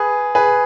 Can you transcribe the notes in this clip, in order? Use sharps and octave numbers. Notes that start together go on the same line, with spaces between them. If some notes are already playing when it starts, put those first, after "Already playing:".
Already playing: G#4 B4
G#4 B4